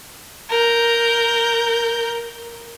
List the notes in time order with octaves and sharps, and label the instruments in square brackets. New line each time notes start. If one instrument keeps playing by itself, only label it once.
[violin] A#4 G6